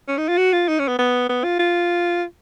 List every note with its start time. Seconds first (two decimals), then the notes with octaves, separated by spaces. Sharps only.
0.08 C#4
0.18 D#4
0.28 F4
0.38 F#4
0.53 F4
0.68 D#4
0.79 C#4
0.88 B3
0.99 B3
1.29 B3
1.44 F4
1.59 F4